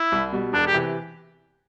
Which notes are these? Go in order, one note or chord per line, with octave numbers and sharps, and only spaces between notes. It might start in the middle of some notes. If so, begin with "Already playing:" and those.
Already playing: E4
C2
B2 G3
E1 D4
G4
C3 E3